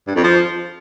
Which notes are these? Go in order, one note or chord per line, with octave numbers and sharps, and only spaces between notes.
G2
F2
F3